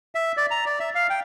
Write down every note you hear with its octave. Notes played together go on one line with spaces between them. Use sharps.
E5
D5
A#5
D5
E5
F5
G5